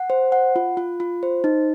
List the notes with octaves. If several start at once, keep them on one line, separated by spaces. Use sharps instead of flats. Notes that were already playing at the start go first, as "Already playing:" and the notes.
Already playing: F#5
C5
F#5
F4
F4
F4
C5
D#4